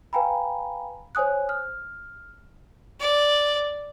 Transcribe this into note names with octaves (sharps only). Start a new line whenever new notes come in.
B4 F5 G5 G#5 A#5 B5
C5 C#5 G#5 D#6 F#6
F6
D5